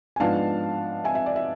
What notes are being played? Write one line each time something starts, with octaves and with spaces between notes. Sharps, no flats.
G#5
G#2 F3 B3 D4 F5 A5
E5 G#5
E5
D5
E5